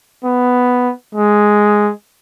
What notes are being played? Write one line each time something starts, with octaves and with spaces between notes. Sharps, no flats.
B3
G#3